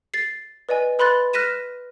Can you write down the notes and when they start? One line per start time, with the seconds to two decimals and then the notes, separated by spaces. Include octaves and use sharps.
0.14 A6 C7
0.69 B4 D5 D#5 G#5
0.99 B4 B5 C6 F#6 A6
1.33 F6 F#6 A#6 B6 D#7 E7